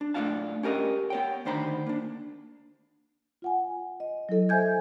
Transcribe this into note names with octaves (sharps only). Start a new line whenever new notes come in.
D4
A2 C#4 D4 F4 F5 A5
C#4 G4 A#4 D#5
B3 C#5 G5
D2 D#3 D4 C5 A#5 B5
A#3 D4
F4 F#5 G#5
D#5
F#3 E4 A4 D#5
C5 E5 G#5 G6 G#6